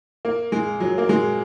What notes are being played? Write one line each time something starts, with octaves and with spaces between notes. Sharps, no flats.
A#3
G#3
F#3
A#3
G#3